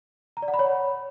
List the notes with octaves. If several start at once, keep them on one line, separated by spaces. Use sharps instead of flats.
A#5
D5
F#5
B5
C#5